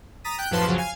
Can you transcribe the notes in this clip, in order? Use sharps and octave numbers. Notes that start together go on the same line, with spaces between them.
A#5 D#6 A6 B6 D#7
G5 F#6 G6
F#2 A2 F3 B4 A5 C6
C#2 F#2 C#3 F3 F#3
F5 G#5